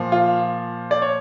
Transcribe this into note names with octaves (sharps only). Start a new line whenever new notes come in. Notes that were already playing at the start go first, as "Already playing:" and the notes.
Already playing: A#2 F3
F4
D5
C#5